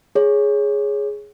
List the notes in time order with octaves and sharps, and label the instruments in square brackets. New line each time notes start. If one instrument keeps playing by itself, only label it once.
[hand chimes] G#4 C#5